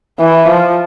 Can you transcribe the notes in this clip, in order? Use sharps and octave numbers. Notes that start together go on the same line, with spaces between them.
E3
F3